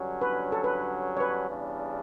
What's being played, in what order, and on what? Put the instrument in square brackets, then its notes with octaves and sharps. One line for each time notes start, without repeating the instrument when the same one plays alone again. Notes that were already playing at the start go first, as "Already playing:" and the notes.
Already playing: [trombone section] G2 D3 F#3 C#4
[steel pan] B4
A4
B4
C#5
B4
[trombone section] E2 C#3 G3 D4